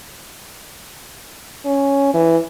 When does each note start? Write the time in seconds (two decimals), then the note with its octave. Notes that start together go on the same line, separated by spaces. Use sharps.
1.65 C#4
2.14 E3